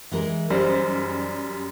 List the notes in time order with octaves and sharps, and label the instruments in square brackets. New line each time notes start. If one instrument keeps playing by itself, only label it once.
[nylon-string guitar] E3 G#3 A#4
[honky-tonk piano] F#2 G3 [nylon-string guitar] D#4 G#4 C5